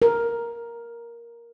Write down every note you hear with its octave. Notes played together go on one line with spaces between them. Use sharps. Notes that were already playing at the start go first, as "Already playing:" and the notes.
A#4